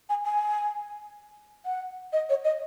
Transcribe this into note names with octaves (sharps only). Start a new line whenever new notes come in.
G#5
G#5
F#5
D#5
C#5
D#5